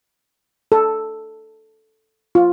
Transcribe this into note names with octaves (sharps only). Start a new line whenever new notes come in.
A4
F4